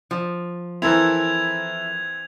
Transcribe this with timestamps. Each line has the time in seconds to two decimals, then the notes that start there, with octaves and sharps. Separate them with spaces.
0.11 F3
0.82 E3 C4 E4 A4 A#4 G#6 F7